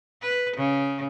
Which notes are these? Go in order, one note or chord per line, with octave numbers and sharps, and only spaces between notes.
B4
C#3